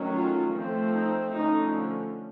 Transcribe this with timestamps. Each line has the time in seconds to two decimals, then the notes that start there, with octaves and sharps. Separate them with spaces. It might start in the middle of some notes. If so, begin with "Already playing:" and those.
Already playing: D#3 F#3 A3 C#4
0.14 F4
0.54 F3 A3 C4
0.94 D#4
1.35 D3 F3 A3 C#4 D#4